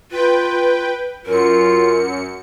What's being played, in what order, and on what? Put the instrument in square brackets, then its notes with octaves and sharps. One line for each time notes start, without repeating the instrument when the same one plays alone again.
[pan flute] F4 [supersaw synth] B4 G5
[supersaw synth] F#2 C#7 [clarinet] F4 [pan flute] A#4